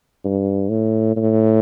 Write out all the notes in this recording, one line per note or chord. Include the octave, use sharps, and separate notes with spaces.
G2
A2
A2